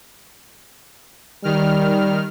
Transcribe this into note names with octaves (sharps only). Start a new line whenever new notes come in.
D#3 G3 F6